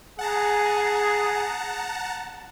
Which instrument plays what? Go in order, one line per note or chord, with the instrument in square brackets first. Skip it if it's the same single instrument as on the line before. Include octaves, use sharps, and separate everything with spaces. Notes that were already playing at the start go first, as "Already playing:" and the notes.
[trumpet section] G#4 [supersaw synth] F#5 A5 A#5